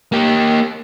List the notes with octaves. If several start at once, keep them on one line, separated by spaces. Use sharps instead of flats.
A#3 G4